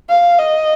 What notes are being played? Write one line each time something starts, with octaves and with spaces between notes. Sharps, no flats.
F5
D#5